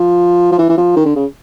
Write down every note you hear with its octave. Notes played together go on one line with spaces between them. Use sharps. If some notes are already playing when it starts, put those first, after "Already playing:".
Already playing: F3
F3
E3
E3
F3
D#3
D3
C#3